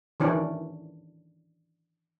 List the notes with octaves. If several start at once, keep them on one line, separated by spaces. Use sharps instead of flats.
D#3 E3 C#4 D4